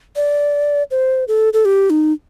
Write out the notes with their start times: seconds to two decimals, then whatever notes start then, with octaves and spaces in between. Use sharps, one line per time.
0.16 D5
0.91 C5
1.28 A4
1.53 A4
1.65 G4
1.90 D#4